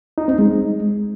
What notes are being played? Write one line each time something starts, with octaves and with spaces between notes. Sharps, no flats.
D#4
C4
G#3